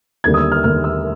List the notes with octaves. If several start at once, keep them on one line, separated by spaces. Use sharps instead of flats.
D#2 D3 G3 A#3 G#6
D#6
E6
F6
D#2 D3 G3 A#3 F6
E6